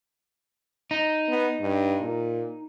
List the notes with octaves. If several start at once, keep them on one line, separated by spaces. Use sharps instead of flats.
D#4
B3
G2
A#2